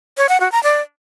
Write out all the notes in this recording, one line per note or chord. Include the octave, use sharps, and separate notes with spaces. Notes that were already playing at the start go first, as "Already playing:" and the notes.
C#5
F#5
F#4
A#5
D5